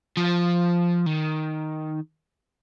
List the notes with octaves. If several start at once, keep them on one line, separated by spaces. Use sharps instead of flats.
F3
D#3